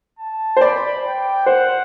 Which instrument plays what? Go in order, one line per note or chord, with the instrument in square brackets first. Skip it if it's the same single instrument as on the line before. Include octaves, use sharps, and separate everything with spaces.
[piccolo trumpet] A5
[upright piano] C5
[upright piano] D5 [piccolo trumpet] B5
[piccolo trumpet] G5
[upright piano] C5 [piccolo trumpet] F#5